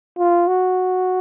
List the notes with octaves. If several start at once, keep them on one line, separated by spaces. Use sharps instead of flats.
F4
F#4